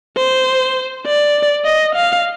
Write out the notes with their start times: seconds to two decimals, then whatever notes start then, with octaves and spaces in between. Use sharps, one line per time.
0.17 C5
1.06 D5
1.65 D#5
1.95 F5